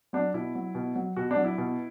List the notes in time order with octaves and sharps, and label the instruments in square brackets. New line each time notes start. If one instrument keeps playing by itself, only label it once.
[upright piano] F#3 D4
B2 E4
F#3
B2
F#3
B2 F#4
D4
F#3
E4
B2